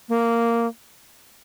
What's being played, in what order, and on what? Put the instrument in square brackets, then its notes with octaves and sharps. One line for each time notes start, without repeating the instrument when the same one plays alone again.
[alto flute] A#3